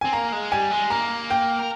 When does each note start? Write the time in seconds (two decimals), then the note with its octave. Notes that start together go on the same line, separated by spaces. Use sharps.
0.01 C4 G#5
0.13 A#3 A#5
0.32 G#3
0.52 G3 G#5
0.71 G#3
0.90 A#3 A#5
1.30 G5
1.59 A#4